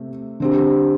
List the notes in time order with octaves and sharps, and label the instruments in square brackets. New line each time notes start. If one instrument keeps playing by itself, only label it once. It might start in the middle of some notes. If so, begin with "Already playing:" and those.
Already playing: [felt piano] C3 A3
D3 C4 G4